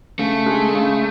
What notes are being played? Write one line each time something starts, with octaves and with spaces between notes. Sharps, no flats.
C#3 A3
G#3
C#3